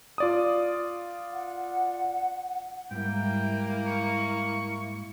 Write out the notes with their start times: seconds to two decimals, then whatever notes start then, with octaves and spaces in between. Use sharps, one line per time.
0.18 F4 D5 D#6
1.33 F#5
2.91 G#2 G3 A#3 E4 G5
3.87 C#6